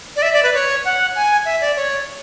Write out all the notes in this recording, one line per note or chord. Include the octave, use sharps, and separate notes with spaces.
D5
E5
D5
B4
C#5
F#5
G#5
E5
D5
C#5